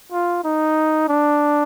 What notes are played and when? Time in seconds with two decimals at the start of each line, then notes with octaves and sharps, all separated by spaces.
0.12 F4
0.44 D#4
1.08 D4